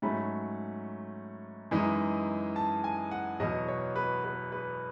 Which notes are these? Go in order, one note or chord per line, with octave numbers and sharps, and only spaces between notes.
G#2 F#3 A3 C#4 B5
F#2 E3 G#3 D#4
A5
G#5
F#5
E2 B2 F#3 D#5
C#5
B4
B4
B4